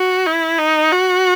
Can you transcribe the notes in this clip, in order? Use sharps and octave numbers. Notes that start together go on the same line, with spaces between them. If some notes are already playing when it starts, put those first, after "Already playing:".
Already playing: F#4
E4
D#4
F#4